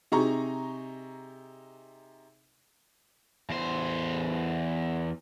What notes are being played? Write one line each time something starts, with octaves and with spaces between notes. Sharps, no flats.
C3 D#4 G#4 A#5 C#6
E2 C5